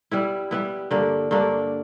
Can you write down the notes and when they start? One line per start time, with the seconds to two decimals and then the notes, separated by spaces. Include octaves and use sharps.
0.11 G3 B3 E4
0.51 G3 B3 E4
0.91 G2 D3 A#3 D4
1.31 G2 D3 A#3 D4